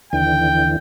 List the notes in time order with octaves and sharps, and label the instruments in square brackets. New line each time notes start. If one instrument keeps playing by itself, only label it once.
[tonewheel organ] D#2 D3 E3 [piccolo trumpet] G5